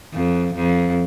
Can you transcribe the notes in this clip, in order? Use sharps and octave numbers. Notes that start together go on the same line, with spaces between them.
F2
F2